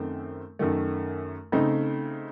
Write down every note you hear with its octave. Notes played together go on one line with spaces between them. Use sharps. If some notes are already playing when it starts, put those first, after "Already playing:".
Already playing: F#2 D#3 A3 C4
F#2 D#3 A3
C#3 A3 C4 D#4